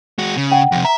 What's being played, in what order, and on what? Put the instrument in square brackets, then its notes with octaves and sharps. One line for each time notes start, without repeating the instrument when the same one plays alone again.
[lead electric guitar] G#3 F#4
C#3
[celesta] F#5 G5
[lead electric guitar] F2 C3
[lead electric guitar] E5 [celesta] A#5